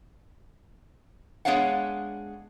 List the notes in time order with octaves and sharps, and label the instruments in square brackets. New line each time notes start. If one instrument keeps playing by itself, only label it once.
[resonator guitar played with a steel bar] G#3 B3 D4 C#5 F5 F#5